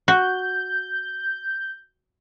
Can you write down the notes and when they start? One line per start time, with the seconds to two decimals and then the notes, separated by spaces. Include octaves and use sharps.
0.08 F#4 G6